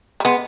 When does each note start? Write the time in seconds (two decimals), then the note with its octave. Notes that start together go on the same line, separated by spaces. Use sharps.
0.20 G3
0.25 G#3 B3